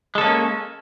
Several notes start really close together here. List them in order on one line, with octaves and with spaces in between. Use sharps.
G#3 A4 C#4 A#3